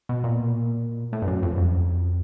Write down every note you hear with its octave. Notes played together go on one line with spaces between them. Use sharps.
B2
A#2
A2
G2
F#2
F2
F2